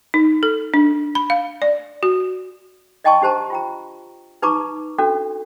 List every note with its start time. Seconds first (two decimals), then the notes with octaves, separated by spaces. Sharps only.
0.14 D#4
0.43 A4
0.74 D4
1.15 B5
1.30 F5
1.62 D5
2.03 F#4
3.04 D5 D#5 G5 A5 C6 C#6
3.21 D4 G4 C5 A5 A#5
3.50 F4 G5 A#5
4.42 D#4 B4 A5 A#5 C#6 D6
4.98 C#4 D4 F#4 A4